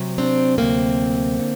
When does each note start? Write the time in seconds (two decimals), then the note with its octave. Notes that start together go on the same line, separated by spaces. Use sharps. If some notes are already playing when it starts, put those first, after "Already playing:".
Already playing: D2 C3 F#3
0.18 C4 D4
0.58 D2 C3 D#3 F#3 A#3 C4
1.40 D3